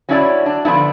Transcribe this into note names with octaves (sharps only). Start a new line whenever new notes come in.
F#3 C#4 D4 E4 C5 D5
D4
D3 F3 B3 D4 E4